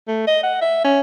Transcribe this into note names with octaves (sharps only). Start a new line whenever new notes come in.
A3
D#5
F#5
E5
C#4